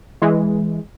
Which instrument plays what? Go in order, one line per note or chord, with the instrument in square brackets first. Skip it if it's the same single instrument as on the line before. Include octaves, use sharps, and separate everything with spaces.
[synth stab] E3 G#3